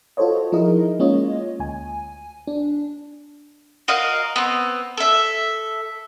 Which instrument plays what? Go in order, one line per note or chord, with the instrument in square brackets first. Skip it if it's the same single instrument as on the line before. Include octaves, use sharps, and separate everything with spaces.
[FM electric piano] F4 F#4 A4 C5 C#5 D#5
F3 D#4 E4 G#4 A#4 D#5
G#3 A#3 C#4 F4 C#5 D#5
D2 G#5
D4
[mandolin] F#4 A#4 D#5 F5
B3 C4
A4 E5